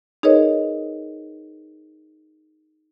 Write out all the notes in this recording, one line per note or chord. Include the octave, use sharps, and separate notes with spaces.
D#4 G#4 A#4 B4 C#5 D#5